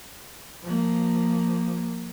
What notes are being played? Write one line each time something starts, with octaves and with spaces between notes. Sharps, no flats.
F3 A#3